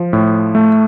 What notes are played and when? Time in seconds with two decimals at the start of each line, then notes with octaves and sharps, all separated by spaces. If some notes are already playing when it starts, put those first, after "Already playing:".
Already playing: F3
0.13 A2
0.55 A3